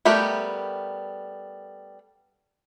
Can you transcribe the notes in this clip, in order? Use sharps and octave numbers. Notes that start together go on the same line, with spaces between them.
G3 A3 B3 G4 A#4